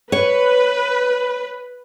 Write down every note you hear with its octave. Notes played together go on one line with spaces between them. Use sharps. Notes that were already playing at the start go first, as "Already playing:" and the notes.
B4 C#5